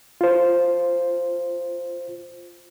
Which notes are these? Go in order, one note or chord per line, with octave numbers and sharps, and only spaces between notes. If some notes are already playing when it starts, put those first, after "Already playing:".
F4 C5